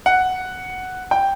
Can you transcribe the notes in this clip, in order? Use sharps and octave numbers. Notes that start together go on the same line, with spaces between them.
F#5
G5